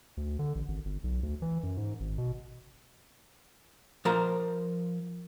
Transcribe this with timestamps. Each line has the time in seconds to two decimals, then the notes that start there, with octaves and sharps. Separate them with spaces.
0.17 D2
0.39 D3
0.55 A1
0.68 G#1
0.85 G1
1.04 B1
1.23 D2
1.42 E3
1.63 F#2
1.77 G#2
2.00 G#1
2.18 B2
4.05 F3 A#4 C5 A#5